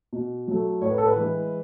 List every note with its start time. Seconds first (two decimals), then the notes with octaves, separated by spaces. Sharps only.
0.13 B2
0.48 F#3 A3
0.82 A2 C#5
0.90 B4
0.98 A4
1.07 B4
1.16 E3 G#3